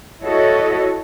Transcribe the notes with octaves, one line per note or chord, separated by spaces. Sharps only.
E4 F#4 A4 C#5 D#5